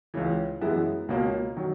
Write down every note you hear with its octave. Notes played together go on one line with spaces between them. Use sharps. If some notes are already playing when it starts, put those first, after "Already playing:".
C#2 C#3 E3
F#2 E3 G#3 B3 E4
C#2 B2 A#3 C#4
D#3 F#3